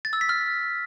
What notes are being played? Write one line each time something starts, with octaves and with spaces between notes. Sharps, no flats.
A6
E6
B6
F6